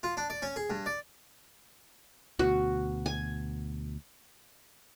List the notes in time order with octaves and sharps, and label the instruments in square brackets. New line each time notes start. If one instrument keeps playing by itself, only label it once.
[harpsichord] F4
D4
D5
C#4
G#4
G2
D5
[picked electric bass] D2 B2 [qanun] F#4
[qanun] G#5